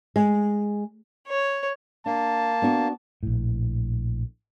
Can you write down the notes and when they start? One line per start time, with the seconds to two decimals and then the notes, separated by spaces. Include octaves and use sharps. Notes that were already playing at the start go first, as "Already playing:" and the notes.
0.16 G#3
1.28 C#5
2.06 A#3 D4 A5
2.62 B3 D4 F#4
3.23 A#1 A2